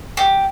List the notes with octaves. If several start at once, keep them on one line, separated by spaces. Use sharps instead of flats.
G4